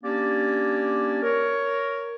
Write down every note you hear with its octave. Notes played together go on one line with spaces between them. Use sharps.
A#3 C#4 D4 G4 D5
A#4 C#5